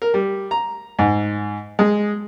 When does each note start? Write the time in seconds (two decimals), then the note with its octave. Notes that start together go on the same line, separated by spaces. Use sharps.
0.02 A#4
0.14 G3
0.51 A#5
0.99 G#2
1.79 G#3